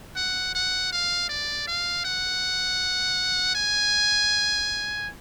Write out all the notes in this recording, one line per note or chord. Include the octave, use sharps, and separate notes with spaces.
F#5
F#5
F5
D5
F5
F#5
G#5